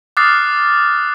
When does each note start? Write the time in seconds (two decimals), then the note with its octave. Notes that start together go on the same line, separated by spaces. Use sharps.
0.17 D6 D#6 F6 F#6 A6 C7